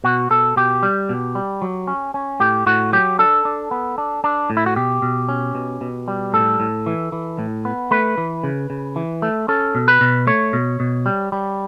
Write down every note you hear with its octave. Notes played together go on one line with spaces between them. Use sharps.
B2 F#4
B2 A4
B2 G4
G3
B2
G3
F#3
C#4
C#4
A2 G4
A2 F#4
F#3 G4
D4 A4
D4
B3
D4
D4
A2
E4
F#4
B2 G4
B2
C#4
B2
B2
G3
A2 A4
A2
E3
E3
A2
B3
A3 B4
E3
C#3
C#3
E3
A3
C#4 A4
B2
B4
B2
A3 C#5
B2
B2
G3
G3